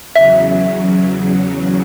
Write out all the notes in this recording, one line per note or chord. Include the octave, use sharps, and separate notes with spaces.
E2 C#3 F#3 E5